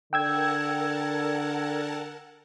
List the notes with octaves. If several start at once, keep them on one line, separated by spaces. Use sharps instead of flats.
D3 A#4 F#5 G5 A5 E6 G#6